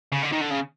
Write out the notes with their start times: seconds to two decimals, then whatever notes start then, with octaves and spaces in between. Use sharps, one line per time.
0.12 C#3
0.22 D3
0.32 D#3
0.41 D3
0.50 C#3